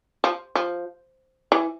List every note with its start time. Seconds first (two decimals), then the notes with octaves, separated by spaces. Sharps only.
0.24 F3
0.55 F3
1.52 E3